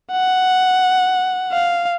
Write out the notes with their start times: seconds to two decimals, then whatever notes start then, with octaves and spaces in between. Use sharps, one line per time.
0.12 F#5
1.52 F5